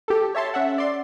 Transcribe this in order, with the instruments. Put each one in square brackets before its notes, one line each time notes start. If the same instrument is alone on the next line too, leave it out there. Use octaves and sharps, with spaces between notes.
[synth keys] G4 A4
C#5 E5 A5 C6
C#4 E5 F#5
D5 C6